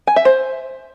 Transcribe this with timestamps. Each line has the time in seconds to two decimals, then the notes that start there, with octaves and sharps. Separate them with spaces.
0.07 G#5
0.16 E5
0.25 C5